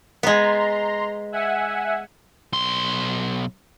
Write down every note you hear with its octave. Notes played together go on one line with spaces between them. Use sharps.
G#3 B3 A#5 C6
E5 F#5 G#5
B1 C6